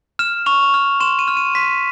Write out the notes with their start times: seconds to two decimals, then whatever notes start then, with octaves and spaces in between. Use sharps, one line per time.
0.19 F6 E7
0.46 C#6 F7
0.74 F6
1.00 C6 E7
1.19 D#7
1.28 F6
1.37 D#7
1.55 C6 B6